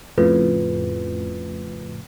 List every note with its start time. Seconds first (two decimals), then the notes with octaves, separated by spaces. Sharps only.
0.18 F2 A2 C#3 F4 B4